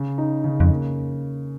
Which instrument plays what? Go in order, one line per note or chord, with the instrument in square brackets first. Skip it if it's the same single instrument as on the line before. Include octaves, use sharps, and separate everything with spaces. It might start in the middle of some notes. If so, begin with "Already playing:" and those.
Already playing: [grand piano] C#3
D#4
C#3
[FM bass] F2
[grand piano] A#3